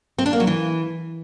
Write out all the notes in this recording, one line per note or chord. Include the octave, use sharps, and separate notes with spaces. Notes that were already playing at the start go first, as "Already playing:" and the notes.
C4
D4
A#3
F#3
E3